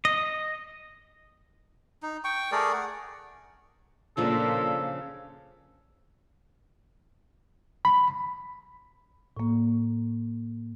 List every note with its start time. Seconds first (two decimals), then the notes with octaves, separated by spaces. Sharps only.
0.05 D#5
2.03 D#4
2.24 G5 C#6
2.52 A3 G#4 A#4 D5
2.73 F#5
4.17 A#2 C#3 F3 D4 A4
7.85 B5
9.37 A2 A#3